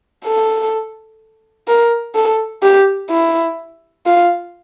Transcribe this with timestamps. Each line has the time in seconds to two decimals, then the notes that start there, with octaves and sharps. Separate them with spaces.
0.25 A4
1.68 A#4
2.15 A4
2.63 G4
3.10 E4
4.06 F4